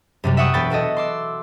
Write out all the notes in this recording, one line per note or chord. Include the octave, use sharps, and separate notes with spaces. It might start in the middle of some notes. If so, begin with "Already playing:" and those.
F#2 C3 G3
E5 F#5 G5 C#6 D#6
E1 B3 G5 B5 A6
B3 F#4 A4 D#5
C6 D6 E6